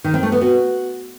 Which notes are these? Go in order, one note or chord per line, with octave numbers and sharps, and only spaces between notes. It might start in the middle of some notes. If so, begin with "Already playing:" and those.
D#3
C4
A3
B3
F#4